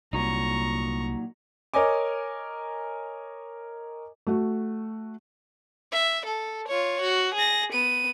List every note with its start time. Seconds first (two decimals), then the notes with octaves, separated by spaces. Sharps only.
0.13 C2 A#2 F#3 D#4 A#5 C#6
1.74 A#4 C#5 D#5 G#5 D6
4.27 A3 F#4
5.93 E5
6.26 A4
6.68 F4 C#5
7.01 F#4
7.35 G#4 A#6
7.73 B3 D#7